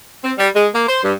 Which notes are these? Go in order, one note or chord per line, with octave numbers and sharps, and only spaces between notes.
C4
G3
G#3
A#3
C5
G2